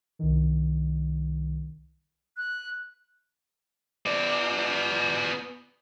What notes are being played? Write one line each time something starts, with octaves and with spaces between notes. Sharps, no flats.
C2 D#3
F#6
B3 D5